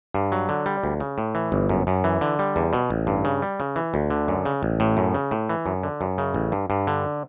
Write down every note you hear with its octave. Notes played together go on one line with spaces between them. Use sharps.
G2
F#3
D3
G3
D2
C#3
A2
E3
G1
F#2
F#2
E3
D3
G3
E2
B2
A1
G2
C#3
G3
C#3
E3
D2
D3
F#2
C#3
A1
A2
F#2
C#3
A2
E3
F#2
D3
F#2
C#3
A1
G2
G2
D3